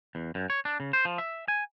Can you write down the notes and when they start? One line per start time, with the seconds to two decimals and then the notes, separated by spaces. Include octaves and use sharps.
0.15 E2
0.35 F#2
0.50 C#5
0.65 D4
0.80 C#3
0.93 C5
1.05 F3
1.18 E5
1.48 G#5